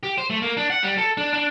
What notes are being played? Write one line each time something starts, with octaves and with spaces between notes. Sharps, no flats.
G4
C5
A3
A#3
D4
F#5
G3
A4
D4
D4